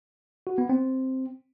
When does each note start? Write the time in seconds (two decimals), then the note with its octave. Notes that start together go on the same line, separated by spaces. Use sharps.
0.47 F#4
0.58 B3
0.69 C4